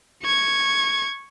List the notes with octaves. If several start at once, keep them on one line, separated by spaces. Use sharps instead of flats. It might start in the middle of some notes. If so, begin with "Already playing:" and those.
C#6 G#6